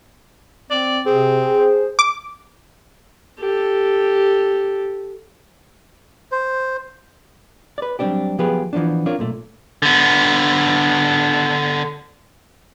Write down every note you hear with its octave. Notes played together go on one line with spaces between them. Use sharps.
C4 D5
C3 C4 G#4
C5
D6
G4 A4
C5
B4 D5
F#3 G3 A3 C4 D4 G4
F3 F#3 B3 G4 G#4 B4
E3 F3 G#3 B3 D4
C4 D4 F4 A#4 C#5
B1 A#2 A3
D3 B3